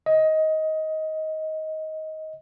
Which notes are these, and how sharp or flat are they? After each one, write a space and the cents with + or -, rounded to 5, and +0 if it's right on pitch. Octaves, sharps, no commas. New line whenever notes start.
D#5 +15